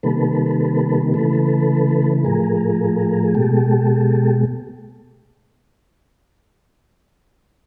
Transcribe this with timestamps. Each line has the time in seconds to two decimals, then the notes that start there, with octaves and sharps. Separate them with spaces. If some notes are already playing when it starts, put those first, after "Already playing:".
0.03 C3 D#3 G3 A#3 A4 B4
1.14 C#3 E3 A3 A4 B4
2.24 A2 F3 A3 G#4 A#4
3.24 G#4
3.35 B2 G#3 G4 A4